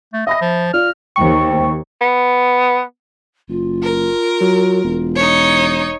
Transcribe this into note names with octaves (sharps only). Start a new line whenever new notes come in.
A3
D#5 E5 B5 A#6
F3
F4 D5 F6
D#2 C5 G5 C#6
B3
F#1 F4
A#4
F#3
E1
D#4 C#5